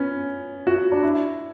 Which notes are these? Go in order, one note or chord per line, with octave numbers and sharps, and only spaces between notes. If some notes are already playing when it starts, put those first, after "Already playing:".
Already playing: B3 C#4
F#4
D4
E4